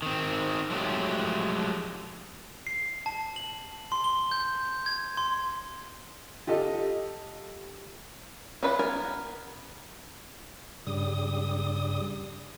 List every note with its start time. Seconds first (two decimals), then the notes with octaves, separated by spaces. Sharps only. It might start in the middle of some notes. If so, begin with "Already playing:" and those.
0.02 D#3 C4
0.71 F3 F#3 G#3 A3 G4
2.67 C7
3.06 A5
3.36 F#7
3.92 C6
4.04 G7
4.31 G6
4.86 G#6
5.17 C6
6.47 F4 G4 A4 D#5
8.63 C#4 F4 B4 D5 F#5
8.79 B3 A#4 G#5
10.87 G2 C#3 G3 D#6